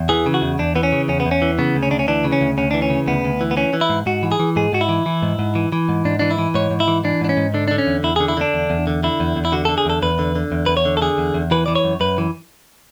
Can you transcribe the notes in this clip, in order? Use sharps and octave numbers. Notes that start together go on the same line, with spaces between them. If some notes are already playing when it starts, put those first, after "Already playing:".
Already playing: E2
E3 G#4
C#3
F#4
E2
E2 D4
E3 B3
C#4
C#3
E2 C#4
B3
E2
C#4
E3
C#3 B3
D2
C#4
D2 D4
C#4
E3 D4
C#3
C#4
D2
D2 C#4
E3 D4
C#4
C#3
D2 B3
D2
E3
B3
E3 C#4
E3
E4
G#2
G#2 F#4
E3
G#4
E3
G#2 G#4
G#2 F#4
E4
E3
E3
G#2
G#2
E3
E3
G#2
G#2 D4
E3 D4
E4
E3
G#2 C#5
G#2
E4
E3
E3 D4
G#2 D4
C#4
G#2
D3 D4
D3 D4
C#4
E2
E2 E4
G#4
D3
E4
D3 D4
E2
E2
D3
D3 E4
E2
E2
E4
D3 F#4
A4
D3
G#4
E2 A4
E2 B4
D3
D3
E2
E2 B4
C#5
D3
A4
D3 G#4
E2
E2
E3 B4
E3 D5
C#5
F#2
F#2 B4
E3